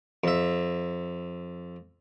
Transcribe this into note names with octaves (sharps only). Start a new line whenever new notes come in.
F2 E5